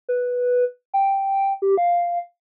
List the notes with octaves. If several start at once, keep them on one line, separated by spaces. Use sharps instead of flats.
B4
G5
G4
F5